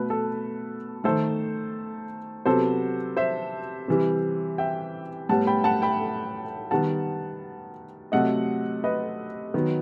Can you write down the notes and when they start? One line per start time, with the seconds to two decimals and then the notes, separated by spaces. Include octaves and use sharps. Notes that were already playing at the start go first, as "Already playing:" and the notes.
Already playing: B2 A3 B4
0.10 A4
1.04 D#3 A3 A4 C5
2.46 C3 F#3 B3 A4 C5
3.17 C5 E5
3.88 C3 E3 G3
4.58 E5 G5
5.29 A2 G3 B3 F#5 A5
5.47 G5 B5
5.64 F#5 A5
5.82 G5 B5
6.71 D#3 G3 B3 F#5 A5
8.12 C3 F#3 A3 D#5 F#5
8.84 B4 D#5
9.54 D#3 F#3 B3